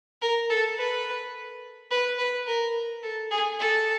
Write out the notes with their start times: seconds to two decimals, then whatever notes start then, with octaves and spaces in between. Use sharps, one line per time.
0.22 A#4
0.50 A4
0.78 B4
1.91 B4
2.18 B4
2.47 A#4
3.03 A4
3.31 G#4
3.59 A4